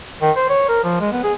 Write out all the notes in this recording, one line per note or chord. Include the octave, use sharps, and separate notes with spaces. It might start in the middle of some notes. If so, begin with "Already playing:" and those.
D#3
C5
C#5
A#4
F3
G#3
B3
G#4